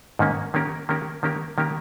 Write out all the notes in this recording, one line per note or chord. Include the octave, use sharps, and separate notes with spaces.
G#2 D#3 A#3 C#4
D#3 A#3 C#4 G4 A#4
D#3 A#3 C#4 G4 A#4
D#3 A#3 C#4 G4 A#4
D#3 A#3 C#4 G4 A#4